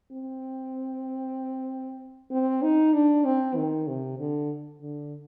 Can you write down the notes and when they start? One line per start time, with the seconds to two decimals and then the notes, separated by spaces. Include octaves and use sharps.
0.12 C4
2.31 C4
2.62 D#4
2.93 D4
3.25 C4
3.56 D#3
3.87 C3
4.18 D3
4.81 D3